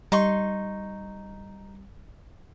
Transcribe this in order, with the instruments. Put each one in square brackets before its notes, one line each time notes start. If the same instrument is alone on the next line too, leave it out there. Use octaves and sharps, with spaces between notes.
[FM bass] G3 [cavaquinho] D#4 C6 C#6